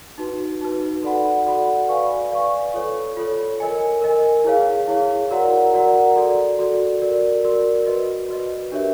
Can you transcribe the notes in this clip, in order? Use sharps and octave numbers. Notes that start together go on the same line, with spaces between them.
D#4 F#4 B4
D#4 F#4 B4
F#4 A4 D5 F#5 B5
F#4 A4 D5 F#5 B5
B4 D5 F5 G#5 C#6
B4 D5 F5 G#5 C#6
F4 A4 C#5
F4 A4 C#5
A#4 D#5 G#5
A#4 D#5 G#5
E4 G#4 C#5 F5
E4 G#4 C#5 F5
F#4 A#4 D5 F#5 A#5
F#4 A#4 D5 F#5 A#5
F#4 A4 D5
F#4 A4 D5
F#4 A#4 D5
F#4 A#4 D5
F#4 B4 D#5
F#4 B4 D#5
D4 G4 A#4 C#5 E5